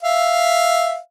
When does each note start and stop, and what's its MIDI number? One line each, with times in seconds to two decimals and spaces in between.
0.03 0.98 76
0.03 0.98 77